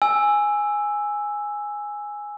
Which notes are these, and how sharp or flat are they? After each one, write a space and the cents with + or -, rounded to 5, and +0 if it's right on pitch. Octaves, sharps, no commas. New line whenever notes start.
G#5 +0 E6 +0